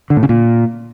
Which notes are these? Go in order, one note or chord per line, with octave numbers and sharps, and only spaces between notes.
D3
A2
C#3
A#2